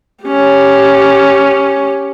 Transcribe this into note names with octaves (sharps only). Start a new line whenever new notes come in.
C#4 G4